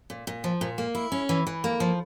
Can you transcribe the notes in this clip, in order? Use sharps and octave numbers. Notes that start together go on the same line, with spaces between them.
A#2
A#2
F3
A#2
A#3
E4
C#4
E3
E3
A#3
F3